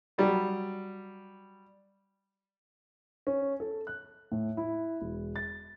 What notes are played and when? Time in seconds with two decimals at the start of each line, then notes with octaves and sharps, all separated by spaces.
0.18 F#3 G3
3.27 C#4
3.60 A4
3.87 F#6
4.32 A2
4.57 E4
5.02 E1
5.36 A6